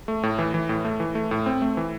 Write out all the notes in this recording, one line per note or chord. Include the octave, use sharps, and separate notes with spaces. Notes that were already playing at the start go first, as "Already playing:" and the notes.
A3
A2
E3
E3
A2
A3
E3
A3
A2
C4
A3
E3